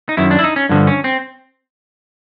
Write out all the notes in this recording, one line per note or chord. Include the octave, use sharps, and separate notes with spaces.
D#4
F#2 D#3 E4
D4
E4
D#4
C#4
G2 D3 F3
C#4
C4